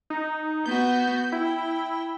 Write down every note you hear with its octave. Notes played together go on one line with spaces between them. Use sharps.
D#4
B3 F#4 G6
E4 G5